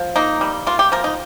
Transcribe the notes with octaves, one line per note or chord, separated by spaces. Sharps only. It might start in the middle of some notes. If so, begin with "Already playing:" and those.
Already playing: F3
A#3 D#4
G3
A#3 F4
G4
F3 A#4
D#4